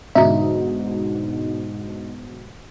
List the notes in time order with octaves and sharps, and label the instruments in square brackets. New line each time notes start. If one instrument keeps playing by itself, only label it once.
[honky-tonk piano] G#2 B2 D3 [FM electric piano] D#4 [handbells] E5 A#5